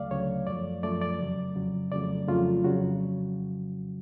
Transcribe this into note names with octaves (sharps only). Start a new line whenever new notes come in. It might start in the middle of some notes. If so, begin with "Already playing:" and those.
Already playing: D2 C#3 F#3 A3 D5 F5
D2 C#3 F#3 A3 C#5
F#2 F3 A3 D5
F#2 F3 A3 D5
D5
F2 C#3 F#3
F2 C#3 F#3
F2 C#3 F#3 A3 D5
F2 C#3 F#3 A3 F4
F2 C#3 F#3 F#4